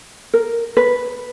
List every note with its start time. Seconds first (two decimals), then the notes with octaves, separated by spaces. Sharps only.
0.34 A#4
0.77 B4